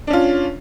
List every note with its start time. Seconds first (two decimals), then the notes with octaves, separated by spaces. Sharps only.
0.07 D4
0.10 C#4
0.13 F4